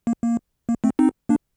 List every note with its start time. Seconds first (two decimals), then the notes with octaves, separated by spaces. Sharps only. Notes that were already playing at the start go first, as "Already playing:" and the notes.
0.07 A#3
0.23 A#3
0.69 A#3
0.84 A3 C4
0.99 C4 D#4
1.29 A#3 D4